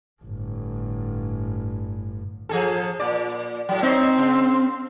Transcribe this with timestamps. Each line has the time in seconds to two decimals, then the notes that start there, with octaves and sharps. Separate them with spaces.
0.22 G1 A2
2.49 F3 G#4 A4
3.00 A#2 D5
3.69 A2 F#3
3.83 C4 D#4 C#5
4.18 C#3